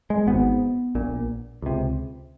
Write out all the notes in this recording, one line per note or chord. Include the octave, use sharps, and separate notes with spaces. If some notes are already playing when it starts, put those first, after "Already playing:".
G#3
G#1 G#2 B3
A#1 A#2
C#2 C3